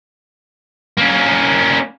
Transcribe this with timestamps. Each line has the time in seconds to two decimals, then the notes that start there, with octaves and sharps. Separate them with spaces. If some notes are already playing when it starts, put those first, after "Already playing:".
0.98 A#3 C#4